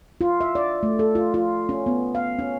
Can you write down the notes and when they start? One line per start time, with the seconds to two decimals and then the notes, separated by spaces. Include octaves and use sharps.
0.21 F4
0.41 E5
0.55 D5
0.83 A3
0.99 A4
1.15 F4
1.34 F4
1.69 C#4
1.86 B3
2.15 F5
2.39 C#4